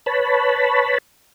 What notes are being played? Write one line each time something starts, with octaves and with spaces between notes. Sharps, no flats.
B4 C#5 A5 B5